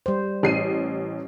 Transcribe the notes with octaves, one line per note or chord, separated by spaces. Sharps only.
G3 C5
A1 C7 D#7